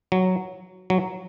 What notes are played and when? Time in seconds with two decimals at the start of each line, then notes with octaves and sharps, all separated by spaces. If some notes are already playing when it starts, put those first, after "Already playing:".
0.12 F#3
0.90 F#3